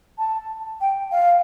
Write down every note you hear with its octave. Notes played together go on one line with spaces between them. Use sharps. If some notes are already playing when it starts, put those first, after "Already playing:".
A5
G5
F5